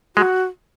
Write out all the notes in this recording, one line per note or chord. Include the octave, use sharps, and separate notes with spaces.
G#3 F#4